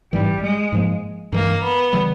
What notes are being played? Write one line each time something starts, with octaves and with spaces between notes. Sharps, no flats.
A1 G#2 E3 G3
G#3
G#2 F3 A#3
G2 E3 G#3 A#3
B3
C#3 E3 G3